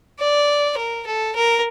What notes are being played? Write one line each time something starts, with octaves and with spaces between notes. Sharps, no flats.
D5
A#4
A4
A#4